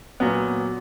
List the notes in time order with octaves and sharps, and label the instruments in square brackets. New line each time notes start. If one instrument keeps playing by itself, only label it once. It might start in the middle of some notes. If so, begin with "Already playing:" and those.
[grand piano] A#2 F#3 B3